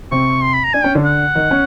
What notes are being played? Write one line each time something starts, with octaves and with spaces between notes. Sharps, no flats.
C3 C4 C#6
C6
B5
A#5
D4 G#5
C#4 G5
D3 D4
F#5
D#3 D#4
C#4